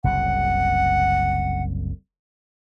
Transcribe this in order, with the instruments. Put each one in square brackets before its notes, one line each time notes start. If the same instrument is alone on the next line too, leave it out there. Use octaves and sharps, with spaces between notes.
[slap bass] F#1 C2 C#3 [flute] F#5